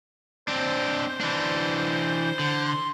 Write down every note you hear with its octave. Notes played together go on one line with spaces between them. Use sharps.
C4 D4 C5
E3 D4
D3
C6